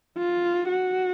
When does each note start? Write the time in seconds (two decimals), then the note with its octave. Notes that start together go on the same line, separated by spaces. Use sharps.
0.18 F4
0.68 F#4